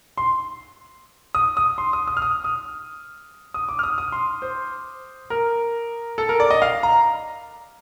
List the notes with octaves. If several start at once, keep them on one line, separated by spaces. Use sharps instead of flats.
C6
D#6
D#6
C6
D#6
D#6
F6
D#6
D#6
D#6
D6
F6
D#6
D#6
C6
C5
A#4
A4
A#4
D5
D#5
F5
A#5